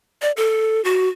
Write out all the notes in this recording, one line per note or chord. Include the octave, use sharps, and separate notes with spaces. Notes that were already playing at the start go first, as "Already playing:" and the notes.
D5
A4
F#4